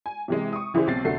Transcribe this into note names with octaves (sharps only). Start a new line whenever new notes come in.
G#5
C3 E3 G#3
C#6 D#6
C#3 E3 E4 G4 G#4 C5
B1 C4 A6 C7
F1 D3 A3 F#4 C7